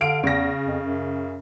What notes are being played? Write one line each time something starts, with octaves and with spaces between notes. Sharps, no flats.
D3 F5 D7
E2 C#3 A#6
F2
F#2